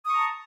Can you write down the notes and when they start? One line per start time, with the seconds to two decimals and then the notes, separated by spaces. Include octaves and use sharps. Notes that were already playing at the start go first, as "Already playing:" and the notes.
0.05 D#6
0.09 C#6
0.12 A#5
0.16 A5